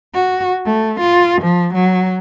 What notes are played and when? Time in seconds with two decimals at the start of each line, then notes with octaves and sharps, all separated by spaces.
0.15 F#4
0.66 A3
1.00 F4
1.42 F3
1.74 F#3